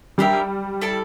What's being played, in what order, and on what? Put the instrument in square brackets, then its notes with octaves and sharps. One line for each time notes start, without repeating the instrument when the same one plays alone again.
[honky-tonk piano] G3 [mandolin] D4 G4 A#4 E5
[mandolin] E4 A4 D5 A5